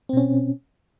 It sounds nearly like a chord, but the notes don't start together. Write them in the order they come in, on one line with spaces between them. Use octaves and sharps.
C4 B2 C#4